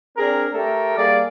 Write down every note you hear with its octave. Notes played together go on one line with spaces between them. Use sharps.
C4 D4 G#4 A#4
A3 G4 A4 A#4
G3 A#3 G#4 D5